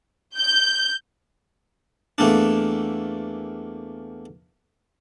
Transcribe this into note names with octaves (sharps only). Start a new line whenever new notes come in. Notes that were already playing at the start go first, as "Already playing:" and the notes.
G6
E2 A3 A#3 D4